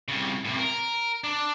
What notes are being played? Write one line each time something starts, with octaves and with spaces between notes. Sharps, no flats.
C2 C#3
A2 C3
A#4
D4